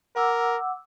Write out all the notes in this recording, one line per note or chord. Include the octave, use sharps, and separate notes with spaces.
A#4 F#5 D6 E6